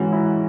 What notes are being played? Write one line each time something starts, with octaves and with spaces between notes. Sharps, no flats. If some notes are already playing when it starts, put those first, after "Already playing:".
Already playing: G#2 E3 C#4 F#4
E4